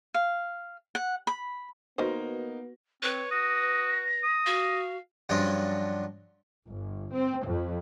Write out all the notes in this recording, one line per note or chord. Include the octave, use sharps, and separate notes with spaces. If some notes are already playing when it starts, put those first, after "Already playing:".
F5
F#5
B5
D#3 A#3 B3 D#4 F#4 B4 C5 C#6
C4 B4 C#5
F#4 D#6 A#6
D#6
F#4 F5
G2 F3 F#3 C#4 D4
G1
C4
F2